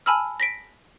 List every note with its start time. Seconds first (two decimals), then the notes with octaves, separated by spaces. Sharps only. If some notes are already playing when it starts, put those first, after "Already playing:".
0.06 G#5 A5 B5 E6 F6
0.40 A#6 B6 D7